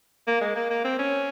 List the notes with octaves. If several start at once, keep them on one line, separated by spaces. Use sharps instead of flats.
A#3
G#3
A#3
A#3
C4
C#4